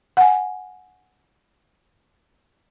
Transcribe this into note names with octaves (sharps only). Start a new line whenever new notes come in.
F#5 G#5